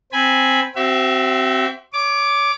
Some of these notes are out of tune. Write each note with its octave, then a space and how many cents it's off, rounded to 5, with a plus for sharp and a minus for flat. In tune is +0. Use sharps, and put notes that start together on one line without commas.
C4 +0 G#5 +0 B5 -10
C4 +0 F#4 +45 E5 +20
C#5 +30 D6 +0